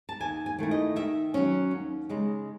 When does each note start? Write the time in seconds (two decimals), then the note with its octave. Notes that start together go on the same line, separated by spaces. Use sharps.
0.09 A5
0.20 D#2 G#5
0.46 G#5
0.59 D#3 A3 E4
0.71 D#5
0.96 D#3 E5
1.34 F#3 C#4
1.71 D#2
2.09 C#3 G#3 D#4